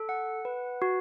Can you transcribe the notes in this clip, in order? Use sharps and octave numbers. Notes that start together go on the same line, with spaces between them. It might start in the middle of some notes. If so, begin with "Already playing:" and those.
Already playing: A4
F#5
B4
F#4